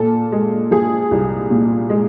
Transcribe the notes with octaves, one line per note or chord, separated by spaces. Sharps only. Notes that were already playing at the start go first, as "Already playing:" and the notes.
Already playing: A#2 A4
G#3
F3 G#4
C2
A#2
G#3